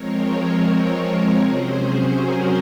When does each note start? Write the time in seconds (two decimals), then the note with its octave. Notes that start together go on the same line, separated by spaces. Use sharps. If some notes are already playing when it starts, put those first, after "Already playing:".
Already playing: F3 G#3 C4 A#4 C#5
1.40 C3 F#3 C#4 G#4 C5
2.15 F#4 A#4